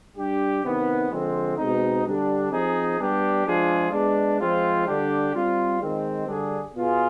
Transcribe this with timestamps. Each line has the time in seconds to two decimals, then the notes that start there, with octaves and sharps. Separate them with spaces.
0.16 G3 D4 G4
0.63 C3 D#3 B3 D#4
1.11 D3 F3 G#3 C4
1.57 B2 G#3 C4 D#4
2.05 D3 G3 D4 G4
2.51 F3 C4 D#4 G#4
2.98 G3 B3 D4 G4
3.45 F3 G#3 D4 F4 G#4
3.92 G#3 B3 D4
4.40 F3 G#3 C4 F4
4.87 D3 G3 D4 G4
5.34 G3 C4 F4
5.81 D#3 G#3 C4
6.28 D3 G3 D4 G#4
6.75 B2 B3 F4 G#4